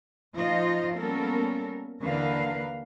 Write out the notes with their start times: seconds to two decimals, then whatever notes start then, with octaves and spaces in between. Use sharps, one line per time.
0.36 F3 D#4 F4 C5 D#5
0.97 G3 A#3 B3 C#4 A4 A#4
2.03 D#2 D3 E3 A#4 B4 F5